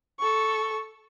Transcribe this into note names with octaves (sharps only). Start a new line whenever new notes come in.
A4 C#6